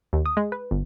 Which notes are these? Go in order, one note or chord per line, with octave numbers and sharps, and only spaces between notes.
D#2
D#6
G#3
B4
G1